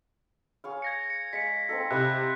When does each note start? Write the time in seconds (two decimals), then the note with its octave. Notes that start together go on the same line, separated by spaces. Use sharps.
0.64 G#4 C#5 F5
0.82 G#6 A#6 C#7
1.10 C#7
1.33 G#3 F5 B6 C#7
1.69 C4 D#4 A4
1.91 C3 E4 D#5 F#6